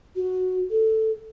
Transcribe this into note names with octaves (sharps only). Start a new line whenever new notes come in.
F#4
A4